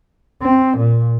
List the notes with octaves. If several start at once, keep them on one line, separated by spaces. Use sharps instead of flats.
C4
A#2